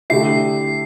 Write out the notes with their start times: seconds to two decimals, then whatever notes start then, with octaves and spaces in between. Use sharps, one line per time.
0.10 D3 A3 E4 G4 E5 C7